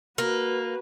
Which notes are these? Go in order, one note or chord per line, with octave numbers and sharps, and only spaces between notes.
A#3 F#4 B4